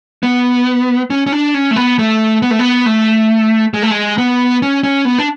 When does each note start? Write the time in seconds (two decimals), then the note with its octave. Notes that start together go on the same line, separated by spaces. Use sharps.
0.23 B3
1.10 C#4
1.27 C#4
1.32 D4
1.54 C#4
1.71 A3
1.76 B3
1.99 A3
2.42 B3
2.51 A3
2.59 B3
2.86 A3
3.74 G#3
3.82 A3
3.91 G#3
4.18 B3
4.62 C#4
4.83 C#4
5.05 B3
5.19 D4